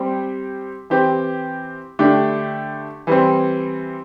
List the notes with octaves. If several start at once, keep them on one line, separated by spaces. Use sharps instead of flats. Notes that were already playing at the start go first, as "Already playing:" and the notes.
Already playing: G3 C4 G4
E3 C4 G4
D3 A3 D4 G4
E3 G3 C4